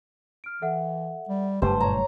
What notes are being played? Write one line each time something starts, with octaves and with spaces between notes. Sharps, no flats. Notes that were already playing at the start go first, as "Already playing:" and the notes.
F6 D7
E3 A4 E5 F#5
G3
F#1 G2 A3 G4 B4 C5 A5
A#2 C#5 A#5